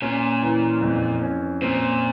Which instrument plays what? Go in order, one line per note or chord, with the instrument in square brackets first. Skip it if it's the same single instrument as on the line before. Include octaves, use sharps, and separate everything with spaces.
[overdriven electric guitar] A#2 [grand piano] C#4
[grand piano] E3
F2
C#4
[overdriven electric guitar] A#2 [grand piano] C4